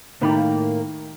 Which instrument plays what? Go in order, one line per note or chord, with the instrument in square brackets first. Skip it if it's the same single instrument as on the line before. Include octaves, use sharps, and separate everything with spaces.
[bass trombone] A2 [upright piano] D#3 [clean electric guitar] A3 G4 B5 [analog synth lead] A#3